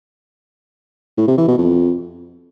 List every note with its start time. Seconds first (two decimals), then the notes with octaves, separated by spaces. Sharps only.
1.17 A2
1.28 C3
1.38 E3
1.48 B2
1.58 F2